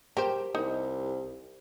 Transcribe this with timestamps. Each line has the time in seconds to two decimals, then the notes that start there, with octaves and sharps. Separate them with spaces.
0.17 G4 A#4 C5
0.55 C2 D#4